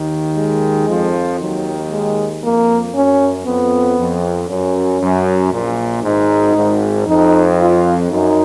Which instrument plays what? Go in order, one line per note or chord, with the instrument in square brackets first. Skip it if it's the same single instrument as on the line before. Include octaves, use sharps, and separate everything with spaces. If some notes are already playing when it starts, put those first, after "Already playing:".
Already playing: [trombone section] D#2 D#3
[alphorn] G#3
[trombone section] F2 F3
[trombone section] D#2 D#3 [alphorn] F#3
[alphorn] G#3
[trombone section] F2 [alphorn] A#3
[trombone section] F#2 [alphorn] C#4
[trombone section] F2 [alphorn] B3
[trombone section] F2
[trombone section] F#2 [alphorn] C#4
[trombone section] F#2
A#1 A#2
[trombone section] G#1 G#2 [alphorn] D#4
[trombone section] G#1 G#2
[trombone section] F2 [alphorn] D#4
[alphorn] F4
[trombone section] F#2 [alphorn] D#4